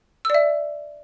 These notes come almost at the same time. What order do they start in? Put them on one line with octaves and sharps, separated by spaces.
E6 D5 E5